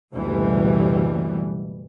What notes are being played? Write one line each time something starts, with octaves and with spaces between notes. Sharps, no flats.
F#1 D2 B2 E3 G3